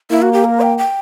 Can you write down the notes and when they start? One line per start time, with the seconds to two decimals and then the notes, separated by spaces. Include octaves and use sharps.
0.10 A#3 E4
0.22 F#4
0.33 G4
0.44 A#4
0.61 G5
0.78 G5